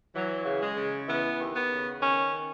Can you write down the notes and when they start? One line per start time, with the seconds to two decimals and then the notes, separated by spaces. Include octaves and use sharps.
0.14 E3 F#3
0.45 C#3
0.60 G#3
0.76 C#3
1.07 E3 B3
1.39 D#2
1.53 B3
1.70 C#3
2.00 D#3 C#4